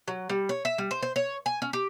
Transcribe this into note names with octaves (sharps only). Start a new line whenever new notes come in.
F#3
G3
C#5
E5
G3
C5
C5
C#5
G#5
C#4
G4